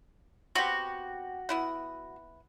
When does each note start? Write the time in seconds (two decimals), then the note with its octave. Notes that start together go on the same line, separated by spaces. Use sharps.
0.55 B3 C4 F#4 G4
1.49 B3 E4 F#5